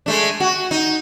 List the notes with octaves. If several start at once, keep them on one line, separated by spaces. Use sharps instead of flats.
G#3 A3 D4
F#4
D#4